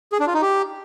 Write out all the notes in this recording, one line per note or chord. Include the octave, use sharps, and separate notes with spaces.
G#4
D4
F4
D#4
G4